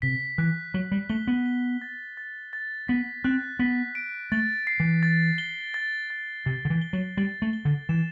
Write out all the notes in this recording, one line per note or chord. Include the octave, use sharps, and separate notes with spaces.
C3 B6
E3 F#6
F#3 F#6
G3
A3 G7
B3
G7
A6
A6
A6
B3 B6
C4 F#6
B3 B6
D7
A3 A6
C7
E3
A6
G7
A6
A6
C3 A6
D3
E3
G7
F#3
G3 A6
A3
G7
D3
E3 E7